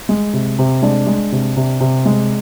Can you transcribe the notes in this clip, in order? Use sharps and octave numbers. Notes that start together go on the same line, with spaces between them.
G#3
C3
C3
G#3 D4
G#3
C3
C3
C3
G#3